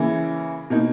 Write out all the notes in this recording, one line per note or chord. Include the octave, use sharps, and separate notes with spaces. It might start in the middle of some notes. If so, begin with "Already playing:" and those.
Already playing: C#3 E3 A#3 E4
B2 A#3 D#4